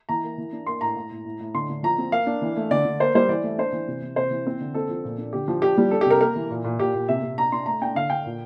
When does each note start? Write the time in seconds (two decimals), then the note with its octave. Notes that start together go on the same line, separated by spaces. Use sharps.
0.09 E3 A#5
0.24 A#3
0.38 E3
0.53 D4
0.66 A#3 C6
0.81 A2 A#5
0.96 A2
1.11 A2
1.25 A2
1.40 A2
1.54 D3 C6
1.70 D3
1.83 F3 A#5
1.98 C4
2.12 A#3 F5
2.27 D4
2.42 E3
2.56 A3
2.71 D3 D5
2.85 D3
3.00 A#3 C5
3.15 G3 C5
3.29 E3 D5
3.43 A3
3.58 D4 C5
3.72 E3
3.88 C3
4.02 E3
4.16 C3 C5
4.31 E3
4.46 C4
4.61 D3
4.74 C4 A4
4.89 F3
5.04 A#2
5.18 D4
5.33 D3 G4
5.48 F3
5.62 D4 G4
5.78 G3
5.91 D4 A4
6.01 G4
6.06 C3 A#4
6.21 A#3 A#4
6.36 E3
6.50 A#2
6.64 A#2
6.79 A#2 G4
6.94 A#2
7.08 C3 E5
7.22 C3
7.37 D4 A#5
7.52 D4 C6
7.66 A3 A#5
7.82 D4 G5
7.95 D3 F5
8.10 D3 G5
8.25 A#2